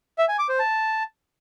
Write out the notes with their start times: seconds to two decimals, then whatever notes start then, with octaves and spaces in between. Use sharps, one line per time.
0.18 E5
0.28 G#5
0.39 D6
0.49 C5
0.59 A5